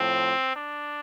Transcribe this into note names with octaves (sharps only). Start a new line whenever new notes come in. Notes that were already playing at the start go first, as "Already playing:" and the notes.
Already playing: A2 F3 C4
D4